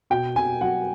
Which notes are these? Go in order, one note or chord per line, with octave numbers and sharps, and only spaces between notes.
B2 G5
B2 G#5
F#3 F#5